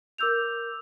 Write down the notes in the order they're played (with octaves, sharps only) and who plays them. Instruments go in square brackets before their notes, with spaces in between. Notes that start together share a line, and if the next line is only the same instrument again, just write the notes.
[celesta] A#4 D6 E6 G6 F7